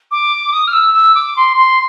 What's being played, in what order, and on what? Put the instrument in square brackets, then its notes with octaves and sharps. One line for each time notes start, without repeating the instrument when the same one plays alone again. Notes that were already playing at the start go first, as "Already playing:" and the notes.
[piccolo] D6
D#6
F6
E6
E6
D6
C6
C6